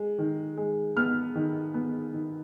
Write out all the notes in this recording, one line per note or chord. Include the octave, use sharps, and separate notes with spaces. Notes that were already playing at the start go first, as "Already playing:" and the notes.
Already playing: G#3
D#3
G#3
B3 F6
D#3
B3
D#3